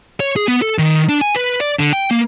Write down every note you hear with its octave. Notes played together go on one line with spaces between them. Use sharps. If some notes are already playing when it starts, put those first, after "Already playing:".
C#5
G#4
B3
A4
D#3
D4
G#5
B4
D5
D3
G5
A#3